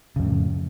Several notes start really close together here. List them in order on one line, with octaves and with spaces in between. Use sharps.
C#3 F2 A2